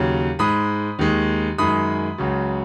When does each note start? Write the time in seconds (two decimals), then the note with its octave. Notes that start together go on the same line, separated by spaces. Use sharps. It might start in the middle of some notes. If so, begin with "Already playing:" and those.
Already playing: D#2 C#3 F#3
0.39 G#2 G#3 B5 D#6
0.99 D#2 D#3 G#3
1.58 F#2 D#3 G#3 B5 D#6
2.18 C#2 C#3 F#3